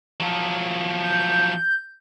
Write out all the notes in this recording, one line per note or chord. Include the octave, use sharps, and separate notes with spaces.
F3 F#3
G6